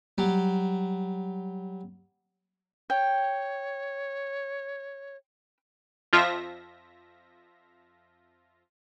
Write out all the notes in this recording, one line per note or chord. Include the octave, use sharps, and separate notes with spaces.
F#3 G3
C#5 G5
F2 F3 F4 E5 A#6